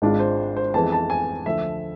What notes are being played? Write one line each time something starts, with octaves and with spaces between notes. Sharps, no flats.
G#1 G#2 G#3 D4 F4
C5
C5
F2 E3 G#3 B3 A5
A5
G#5
D2 D3 F3 E5